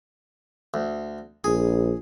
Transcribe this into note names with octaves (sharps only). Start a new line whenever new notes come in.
D2
A#1 G#4